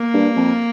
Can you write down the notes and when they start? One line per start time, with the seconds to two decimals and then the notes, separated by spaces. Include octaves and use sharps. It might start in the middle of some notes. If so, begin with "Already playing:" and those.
Already playing: A#3
0.14 G2
0.36 F2